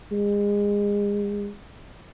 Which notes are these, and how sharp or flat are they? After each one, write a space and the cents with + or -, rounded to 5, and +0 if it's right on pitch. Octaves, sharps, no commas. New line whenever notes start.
G#3 -30